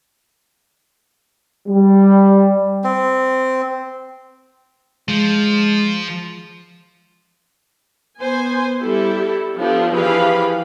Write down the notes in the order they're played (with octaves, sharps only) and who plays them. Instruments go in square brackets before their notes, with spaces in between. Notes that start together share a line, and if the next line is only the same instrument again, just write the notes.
[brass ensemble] G3
[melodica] C4
[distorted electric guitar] F3 [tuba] G#3
[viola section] B3 C5 G#5
G3 E4 G4 A4
F3 B3 D4 G4 A4 C5
E3 F3 G4 G#4 F5 B5